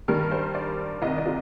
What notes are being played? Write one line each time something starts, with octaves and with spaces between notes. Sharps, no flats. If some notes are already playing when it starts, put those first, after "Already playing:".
G2 D#3 G3 A#4
C5
D5
C2 C3 D#3 D#5
D5
F4